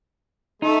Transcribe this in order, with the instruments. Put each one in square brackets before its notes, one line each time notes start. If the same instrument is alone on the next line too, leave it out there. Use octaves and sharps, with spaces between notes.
[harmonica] A3 [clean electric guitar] D#4